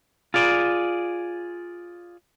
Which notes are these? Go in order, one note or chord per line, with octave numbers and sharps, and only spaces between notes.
F4 G#4 D5